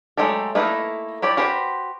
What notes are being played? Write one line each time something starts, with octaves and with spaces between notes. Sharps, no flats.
F#3 G#3 A3 G4 A4
A3 A#3 D#4 E4 B4
E4 G4 C#5 D5
F#4 G4 B4 C5